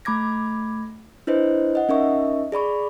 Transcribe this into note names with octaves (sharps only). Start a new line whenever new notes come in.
A3 B5 D6 G#6 A#6
D4 E4 B4 C5 D#5
D#5 F#5
C#4 D#4 A#4 D#5 E5 C#6
G#4 D5 B5 C#6